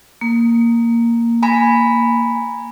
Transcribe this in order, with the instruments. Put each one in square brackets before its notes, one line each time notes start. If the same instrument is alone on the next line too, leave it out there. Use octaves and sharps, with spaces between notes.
[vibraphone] A#3
[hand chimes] G#5 A#5 B5